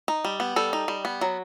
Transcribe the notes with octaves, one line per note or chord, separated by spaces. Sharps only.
D#4
G3
B3
G3 A4
D#4
G3
B3
F#3